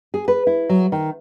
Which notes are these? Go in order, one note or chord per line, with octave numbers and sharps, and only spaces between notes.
G#4
B4
E4
F#3
D#3